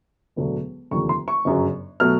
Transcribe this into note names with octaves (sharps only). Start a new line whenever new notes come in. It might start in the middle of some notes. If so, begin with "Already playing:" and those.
E1 D2 D3 F#3
F1 D#2 D3 F3 C#6
C6
C#6
G1 F#2 C#3 F#3
B2 F#3 A3 F6